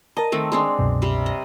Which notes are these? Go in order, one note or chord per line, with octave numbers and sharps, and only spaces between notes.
A#4 D#5 A5 A#5
D#3 A3 C4
G#3 C4 D4
C2 F#2 B2
C3 G3
D#5